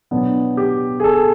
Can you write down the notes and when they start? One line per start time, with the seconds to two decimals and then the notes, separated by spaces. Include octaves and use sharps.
0.11 B2 F#3 B3 D4
0.57 G4
1.00 G#4
1.04 A4